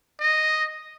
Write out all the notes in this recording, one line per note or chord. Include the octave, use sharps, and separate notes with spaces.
D#5